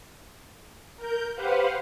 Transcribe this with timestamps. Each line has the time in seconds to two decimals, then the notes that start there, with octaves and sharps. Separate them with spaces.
0.96 A#4 G6
1.35 G4 B4 C5 F5 F#5